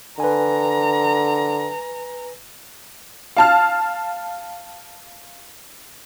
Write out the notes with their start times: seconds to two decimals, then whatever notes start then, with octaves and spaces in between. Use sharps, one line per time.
0.20 D3 B4 G#5 A#5
3.37 F5 A5 F6